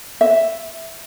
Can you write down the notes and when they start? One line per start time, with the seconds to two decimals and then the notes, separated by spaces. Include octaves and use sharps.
0.21 E5